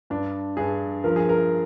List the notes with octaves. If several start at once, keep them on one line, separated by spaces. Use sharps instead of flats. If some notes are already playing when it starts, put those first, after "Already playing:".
G2 D4
G2 G#4
F3 A#4
G#4
A#4